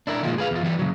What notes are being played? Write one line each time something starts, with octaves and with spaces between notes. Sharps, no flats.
D4 E4 A#4
D#3 F3 G#3 A#3 F4
G#4 B4 F5
E2 F4
E3 G3 B3
C#3 F#3